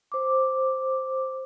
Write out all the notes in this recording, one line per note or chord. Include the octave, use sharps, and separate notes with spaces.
C5 D6